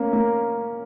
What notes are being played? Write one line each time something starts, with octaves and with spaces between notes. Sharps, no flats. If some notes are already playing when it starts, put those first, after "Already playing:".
Already playing: A#3 C#4
A#3